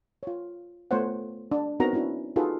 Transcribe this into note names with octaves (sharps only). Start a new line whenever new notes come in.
F4 C#5
A3 B3 F4 C5 C#5 F#5
D4
B3 C4 D#4 F#4 A#4 A#5
C#4 D4 E4 F#4
D#4 F4 F#4 G#4 A4 B4